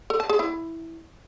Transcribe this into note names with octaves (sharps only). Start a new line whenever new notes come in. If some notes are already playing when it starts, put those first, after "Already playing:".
A4
A5
G#4
E4